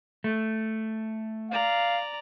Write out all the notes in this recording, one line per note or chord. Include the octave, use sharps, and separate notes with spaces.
A3
D5 F5 A#5